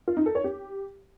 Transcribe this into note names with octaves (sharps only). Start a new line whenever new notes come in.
F4
D#4
A4
C#5
G4